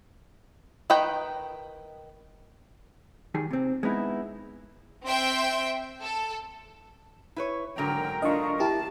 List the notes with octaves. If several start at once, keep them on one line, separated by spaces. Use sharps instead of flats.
D#3 B4 D#5 G5
D#3 G3 G#4
C3 C4
G#3 B3 D#4 E4
C4 E5 G5 C6
A4
E4 B4 C#5
G#2 D3 F#3 A#4 G5
D4 F4 D#5 C#6
E4 G4 A5